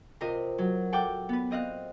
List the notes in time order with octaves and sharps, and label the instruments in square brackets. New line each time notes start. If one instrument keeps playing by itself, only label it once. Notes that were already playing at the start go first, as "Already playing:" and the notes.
[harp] C3 F4 A#4 D#5 D#6
F#3
A4 F#5 G5 D6
B3 B4
C4 D#5 F5 F#6